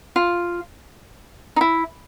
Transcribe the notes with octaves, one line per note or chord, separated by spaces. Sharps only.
F4
D#4
E4